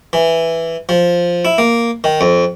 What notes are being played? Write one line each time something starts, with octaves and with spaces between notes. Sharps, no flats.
E3
F3
E4
A#3
D#3
F2